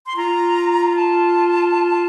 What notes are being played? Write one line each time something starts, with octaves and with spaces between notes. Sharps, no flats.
C6
F4 A#5
A5